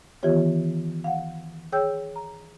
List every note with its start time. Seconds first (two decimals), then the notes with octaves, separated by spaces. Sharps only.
0.23 D#3 E3 B3 F4 G4 C#5
1.04 F5 F#5
1.72 G#4 C#5 G5 E6 G6
2.16 A#5